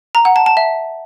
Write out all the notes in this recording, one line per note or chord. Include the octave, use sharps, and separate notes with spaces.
A#5
F#5
A5
A5
E5